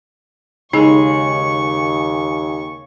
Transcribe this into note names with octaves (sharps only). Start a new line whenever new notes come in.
D#2 C#3 G#3 D#4 G#4 C#6